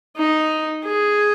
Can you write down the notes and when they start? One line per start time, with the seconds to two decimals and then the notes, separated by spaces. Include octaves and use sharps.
0.17 D#4
0.85 G#4